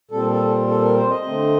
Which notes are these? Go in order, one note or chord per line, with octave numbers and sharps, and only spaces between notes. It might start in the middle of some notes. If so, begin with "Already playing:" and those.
A#2 G3 C4 A4
A4
A4
A#4
C5
D#5
D3 A3 C4